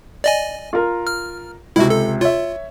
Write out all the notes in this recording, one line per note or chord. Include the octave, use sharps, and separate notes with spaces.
D5 D#5 G#5
F4 A#4
F6
C#2 C3 E4 F#4
A4
F4 C#5 E5